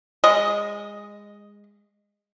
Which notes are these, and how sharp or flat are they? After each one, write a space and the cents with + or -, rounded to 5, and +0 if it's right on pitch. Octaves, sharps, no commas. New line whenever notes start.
G#3 -20 D#5 +0